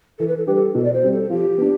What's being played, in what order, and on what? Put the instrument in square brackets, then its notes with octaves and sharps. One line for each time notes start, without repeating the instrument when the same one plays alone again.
[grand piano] E3 [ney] A4
[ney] B4
A4
[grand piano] G3 D4 G4 [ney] B4
[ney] A4
[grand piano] B2 [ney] A4
[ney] D5
C5
[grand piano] G3 C4
[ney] A4
[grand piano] F3 [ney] G4
[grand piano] B3 D4